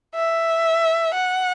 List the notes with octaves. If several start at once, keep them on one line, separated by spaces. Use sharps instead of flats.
E5
F#5